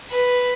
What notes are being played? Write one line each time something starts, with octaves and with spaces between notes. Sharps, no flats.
B4